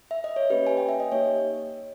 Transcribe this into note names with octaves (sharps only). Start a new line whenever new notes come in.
E5
D#5
C#5
A#3 C#4 G4 B4
G#5
G5
E5
D#5
A#3 D#4 G4 C#5